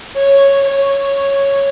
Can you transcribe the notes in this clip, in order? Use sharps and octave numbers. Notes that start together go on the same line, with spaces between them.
C#5
C#5